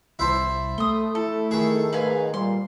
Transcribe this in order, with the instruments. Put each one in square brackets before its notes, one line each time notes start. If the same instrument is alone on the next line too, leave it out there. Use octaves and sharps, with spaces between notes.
[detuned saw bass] C2 [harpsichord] E4 C5 A5
[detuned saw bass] A3 [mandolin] C6 D#6
[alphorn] E4 [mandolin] A4
[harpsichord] D#3 G#4
[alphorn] G#2 [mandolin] B4 F5 G#5
[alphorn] A#2 [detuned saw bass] G3 [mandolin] C6